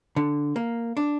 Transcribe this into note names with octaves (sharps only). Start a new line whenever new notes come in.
D3
A#3
D4